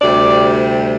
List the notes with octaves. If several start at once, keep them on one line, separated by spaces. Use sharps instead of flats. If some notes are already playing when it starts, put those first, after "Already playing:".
D2 C3 G3 D5